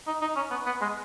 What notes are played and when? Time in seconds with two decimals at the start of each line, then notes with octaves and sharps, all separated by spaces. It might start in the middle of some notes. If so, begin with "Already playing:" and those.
0.07 D#4
0.21 D#4
0.36 C#4
0.51 B3
0.66 B3
0.81 G#3